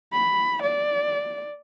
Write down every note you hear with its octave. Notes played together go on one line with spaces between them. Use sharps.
B5
D5